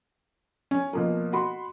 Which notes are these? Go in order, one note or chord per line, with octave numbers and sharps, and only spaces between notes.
C#4
B2 F3 A#3
F#4 B5 C6